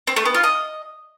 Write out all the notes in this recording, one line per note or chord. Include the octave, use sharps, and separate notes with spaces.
C4
A3
B3
F4
D#5